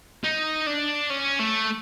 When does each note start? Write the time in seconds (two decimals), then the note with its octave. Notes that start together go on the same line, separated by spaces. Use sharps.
0.24 D#4
0.67 D4
1.10 C#4
1.40 A3